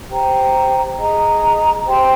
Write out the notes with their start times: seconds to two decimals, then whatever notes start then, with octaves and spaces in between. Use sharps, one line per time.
0.08 G4 C5 G5 A#5
0.98 G#4 D#5 A#5
1.87 G4 C5 G5 C6